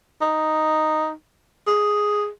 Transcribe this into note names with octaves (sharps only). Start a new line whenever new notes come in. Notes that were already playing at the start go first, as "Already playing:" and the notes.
D#4
G#4